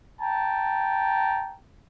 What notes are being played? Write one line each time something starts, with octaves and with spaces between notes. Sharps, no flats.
G5 A5 A#5